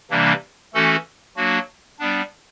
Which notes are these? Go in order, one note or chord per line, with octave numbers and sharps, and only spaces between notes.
C3 E3 G3 A#3 D4
E3 A3 C#4 F#4 A4
F#3 A#3 D4 F#4
G3 B3 D4